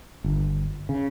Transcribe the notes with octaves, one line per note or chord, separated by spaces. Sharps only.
G1
C#3